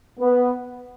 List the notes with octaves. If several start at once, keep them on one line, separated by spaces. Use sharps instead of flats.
B3